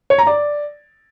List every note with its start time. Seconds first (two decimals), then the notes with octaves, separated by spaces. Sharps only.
0.10 C#5
0.18 A#5
0.27 D5